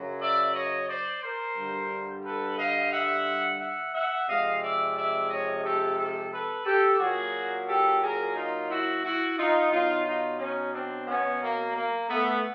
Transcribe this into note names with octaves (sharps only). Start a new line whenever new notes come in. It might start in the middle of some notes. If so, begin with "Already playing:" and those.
Already playing: F#2 C#3 F#3
D5 E5
C#5 D#5
C5 D5
A#4 C5
G2 D3 G3
A4 B4
D#5 F5
E5 F#5
E5 F#5
E5 F#5
C3 F3 G#3 D#5 F5
D5 E5
D5 E5
C#5 D#5
G4 A4
G4 A4
A4 B4
G4 A4
A#2 F#3 F#4 G#4
G4 A4
G#4 A#4
D#4 F4
E4 F#4
E4 F#4
D#4 F4
B2 F#3 D#4 F4
D#4 F4
C#4 D#4
C4 D4
B3 C#4
A#3
A#3
A3 B3